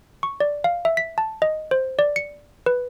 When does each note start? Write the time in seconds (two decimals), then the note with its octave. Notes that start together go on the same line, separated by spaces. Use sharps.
0.23 C#6
0.40 D5
0.64 F5
0.85 E5
0.97 B6
1.18 A5
1.42 D#5
1.71 C5
1.99 D5
2.16 C#7
2.66 B4